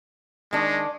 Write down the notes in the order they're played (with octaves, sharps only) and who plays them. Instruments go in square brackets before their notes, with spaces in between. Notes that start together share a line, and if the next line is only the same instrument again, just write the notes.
[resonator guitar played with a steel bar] D#3 D4 [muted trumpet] G#3